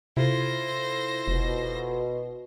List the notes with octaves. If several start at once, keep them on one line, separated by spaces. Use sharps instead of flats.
C3 E4 F4 A4 C5 A#6
F1 B2